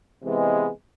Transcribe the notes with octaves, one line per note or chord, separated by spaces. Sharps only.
C3 E3 G#3 B3